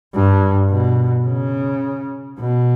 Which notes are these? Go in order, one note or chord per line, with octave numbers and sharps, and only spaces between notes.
G2
B2
C#3
B2